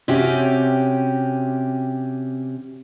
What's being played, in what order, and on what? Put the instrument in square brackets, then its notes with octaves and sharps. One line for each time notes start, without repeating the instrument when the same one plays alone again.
[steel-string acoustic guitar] C3 C4 C#4 F#4 G4